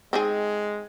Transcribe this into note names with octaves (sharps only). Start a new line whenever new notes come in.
G#3 C4 D#4 G#4